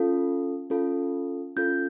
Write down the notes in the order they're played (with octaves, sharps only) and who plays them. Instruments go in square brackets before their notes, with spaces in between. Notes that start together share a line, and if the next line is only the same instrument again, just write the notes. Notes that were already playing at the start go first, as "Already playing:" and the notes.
Already playing: [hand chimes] C#4 F4 A4
C#4 F4 A4
C#4 F4 A4 G6